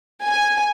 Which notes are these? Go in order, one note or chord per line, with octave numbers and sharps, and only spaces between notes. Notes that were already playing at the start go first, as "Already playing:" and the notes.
G#5